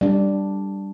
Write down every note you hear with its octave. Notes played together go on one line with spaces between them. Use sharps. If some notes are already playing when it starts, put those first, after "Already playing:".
G3 D4